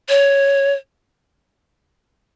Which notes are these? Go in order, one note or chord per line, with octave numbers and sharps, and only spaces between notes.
C#5